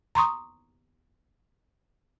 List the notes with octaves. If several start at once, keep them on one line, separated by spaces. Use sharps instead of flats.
A#5 C6 C#6 D#6